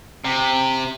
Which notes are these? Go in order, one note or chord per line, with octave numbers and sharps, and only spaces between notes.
C3